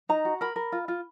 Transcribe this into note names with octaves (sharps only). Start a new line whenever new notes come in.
D#4 A#5
F#4
A#4 B5
A#4
F4
F4